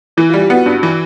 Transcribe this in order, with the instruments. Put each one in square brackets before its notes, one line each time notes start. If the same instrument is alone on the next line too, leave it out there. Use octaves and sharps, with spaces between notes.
[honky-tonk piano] E3 [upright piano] E4
[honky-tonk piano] G3 [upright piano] F4
[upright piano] G4
[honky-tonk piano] B3 [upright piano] F#4
[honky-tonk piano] G2
E3